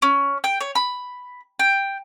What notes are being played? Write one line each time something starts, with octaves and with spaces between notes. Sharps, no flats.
C#4
G5
C#5
B5
G5